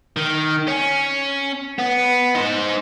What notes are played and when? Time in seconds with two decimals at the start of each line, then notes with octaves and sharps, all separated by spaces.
0.16 D#3
0.68 C#4
1.79 B3
2.35 D#4 C5